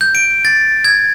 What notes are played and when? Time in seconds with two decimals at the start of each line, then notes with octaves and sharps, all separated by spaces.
0.01 G6
0.15 D7
0.45 A6
0.85 G#6